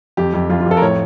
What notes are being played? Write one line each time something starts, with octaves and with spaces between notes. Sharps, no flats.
F2 G4
F2
F2 F4
F4
F2 A4
A#4
A2 C#5